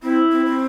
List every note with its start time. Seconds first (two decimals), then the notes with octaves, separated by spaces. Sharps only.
0.03 C4 E4
0.32 C4
0.46 C4